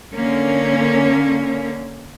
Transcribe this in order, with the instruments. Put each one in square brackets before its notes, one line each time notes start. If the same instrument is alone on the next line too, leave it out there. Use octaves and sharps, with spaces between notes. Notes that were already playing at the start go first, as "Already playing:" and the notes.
[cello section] D3 A#3 C#4